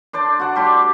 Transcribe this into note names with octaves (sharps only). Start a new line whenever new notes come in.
D4 C5 D5
F#4 F#5 A5
G3 G4 C6 D6